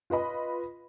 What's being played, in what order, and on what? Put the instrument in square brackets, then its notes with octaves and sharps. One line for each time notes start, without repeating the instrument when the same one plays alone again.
[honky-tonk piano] F4 B4 D#5 B5